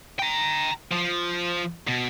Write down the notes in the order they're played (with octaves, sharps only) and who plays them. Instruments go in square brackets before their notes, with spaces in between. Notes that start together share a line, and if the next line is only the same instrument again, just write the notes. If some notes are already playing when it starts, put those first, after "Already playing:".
[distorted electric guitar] G5 A#5
F3
B2